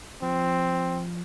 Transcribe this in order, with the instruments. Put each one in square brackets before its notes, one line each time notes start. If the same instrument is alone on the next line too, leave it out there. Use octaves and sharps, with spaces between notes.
[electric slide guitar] F3 [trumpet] C4